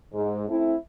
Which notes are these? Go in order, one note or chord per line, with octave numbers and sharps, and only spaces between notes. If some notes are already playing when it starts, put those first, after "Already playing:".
G#2
A3 C4 E4